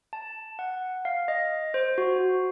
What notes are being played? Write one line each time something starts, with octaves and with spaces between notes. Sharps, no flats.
A5
F#5
F5
D#5
C5
F#4